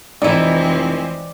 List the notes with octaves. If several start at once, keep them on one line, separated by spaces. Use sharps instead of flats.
F1 E3 G#3 C4 D#4 E4 D5